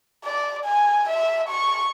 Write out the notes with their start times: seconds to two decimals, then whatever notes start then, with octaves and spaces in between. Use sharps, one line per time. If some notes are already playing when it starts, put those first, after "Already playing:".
0.24 D5
0.65 G#5
1.09 E5
1.49 C#6